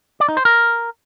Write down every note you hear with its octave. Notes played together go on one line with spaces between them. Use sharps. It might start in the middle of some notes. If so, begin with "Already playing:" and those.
D5
D#4
C5
A#4